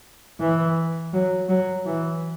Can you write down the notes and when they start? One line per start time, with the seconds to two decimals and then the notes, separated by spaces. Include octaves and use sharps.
0.40 E3
1.13 F#3
1.49 F#3
1.86 E3